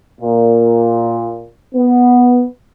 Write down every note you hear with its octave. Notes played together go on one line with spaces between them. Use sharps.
A#2
B3